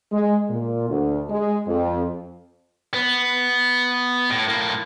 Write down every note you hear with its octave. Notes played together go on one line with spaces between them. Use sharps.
G#3
A#2
D2
G#3
F2
B3
A2
A2 A#3